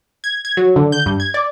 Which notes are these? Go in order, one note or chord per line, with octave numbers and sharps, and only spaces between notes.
G#6
G#6
F#3
D3
G6
G2
G#6
D5